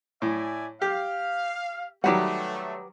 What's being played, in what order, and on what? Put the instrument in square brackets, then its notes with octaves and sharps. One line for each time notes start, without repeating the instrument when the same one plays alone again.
[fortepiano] A2 [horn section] D5 E5 G#5
[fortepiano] G4 [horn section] F5
[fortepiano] D#3 F#3 G3 [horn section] A3 [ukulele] G4 B4 F#5